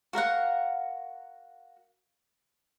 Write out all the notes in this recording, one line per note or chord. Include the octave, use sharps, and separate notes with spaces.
F#4 A#4 F5 F#5